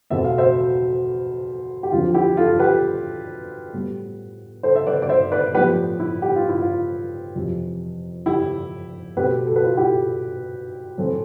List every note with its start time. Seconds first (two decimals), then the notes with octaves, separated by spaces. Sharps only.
0.10 E2 B2 A3 C4 E5
0.24 F5
0.38 C5 E5
1.83 G4
1.92 E2 D3 F3 C4 F4
2.14 E4 G4
2.37 F4 A4
2.51 A4
2.59 G4 B4
3.73 A2 G3 B3
4.63 A4 C5
4.76 E5
4.87 B4 D5
5.02 D5
5.09 C5 E5
5.32 B4 D5
5.54 A2 F3 B3 G4 B4
6.00 E4
6.22 G4
6.35 F4
6.49 E4
6.62 F4
7.36 F2 C3 E3
8.26 E4 G4
9.17 B2 A3 C4 G4 B4
9.47 A4
9.56 B4
9.65 F4 A4
9.77 E4 G4
10.98 A2 E3 A3 C4